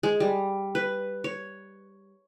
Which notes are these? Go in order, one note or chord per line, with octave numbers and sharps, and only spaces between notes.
G#3
G3
B4
C#5